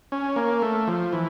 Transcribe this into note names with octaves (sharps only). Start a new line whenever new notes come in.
C#4
A#3
A3
F3
E3